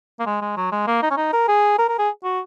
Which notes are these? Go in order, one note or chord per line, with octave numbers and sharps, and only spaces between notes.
A#3
G#3
G#3
F#3
G#3
A#3
D#4
C#4
D#4
A#4
G#4
A#4
A#4
G#4
F#4